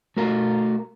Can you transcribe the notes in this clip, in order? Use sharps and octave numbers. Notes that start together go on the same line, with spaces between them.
A3 F#4 A#4